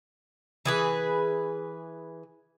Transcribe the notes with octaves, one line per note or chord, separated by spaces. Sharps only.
E3 G#4 B4